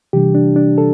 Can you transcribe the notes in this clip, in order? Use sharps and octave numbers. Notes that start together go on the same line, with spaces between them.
C3 E3 G3 D4 G4
D4
D4
A4